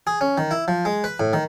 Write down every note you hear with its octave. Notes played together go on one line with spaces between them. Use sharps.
G#4
C#4
D#3
E4
F3
G#3
B4
A2
D#3